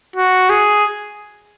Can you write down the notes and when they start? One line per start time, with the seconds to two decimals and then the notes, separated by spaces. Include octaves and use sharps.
0.16 F#4
0.50 G#4